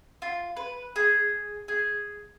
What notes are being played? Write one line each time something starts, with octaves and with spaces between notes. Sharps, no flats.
F4
B4
G#4
G#4